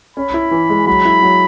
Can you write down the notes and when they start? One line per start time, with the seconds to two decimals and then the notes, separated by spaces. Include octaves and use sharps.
0.17 C#4 B5
0.34 E4
0.51 E3
0.70 G#3
0.87 F#3 B5
1.05 E4
1.23 F#3